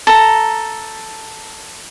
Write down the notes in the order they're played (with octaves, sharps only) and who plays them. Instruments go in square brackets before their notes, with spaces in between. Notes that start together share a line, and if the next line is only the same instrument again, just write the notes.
[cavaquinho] A4 A#5